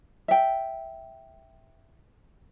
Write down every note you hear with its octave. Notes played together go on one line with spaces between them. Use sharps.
E5 G5